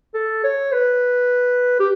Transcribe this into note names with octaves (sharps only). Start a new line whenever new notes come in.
A4
C#5
B4
G4